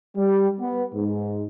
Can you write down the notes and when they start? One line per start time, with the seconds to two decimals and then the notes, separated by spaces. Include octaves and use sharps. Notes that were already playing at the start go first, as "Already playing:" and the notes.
0.16 G3
0.59 B3
0.94 G#2